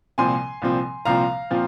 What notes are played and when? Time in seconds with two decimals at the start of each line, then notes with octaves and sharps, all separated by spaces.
0.18 C2 A#2 F3 C4 G#5 C6
0.62 C2 A#2 F3 C4
1.05 C2 A#2 F3 C4 F5 A#5
1.50 A#2 F3 C4